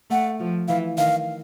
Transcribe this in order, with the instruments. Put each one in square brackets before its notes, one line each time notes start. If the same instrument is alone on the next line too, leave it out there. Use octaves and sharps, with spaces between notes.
[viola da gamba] A3 [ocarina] F#5
[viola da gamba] F3
[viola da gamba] E3 [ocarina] F5
[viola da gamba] D#3 [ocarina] F5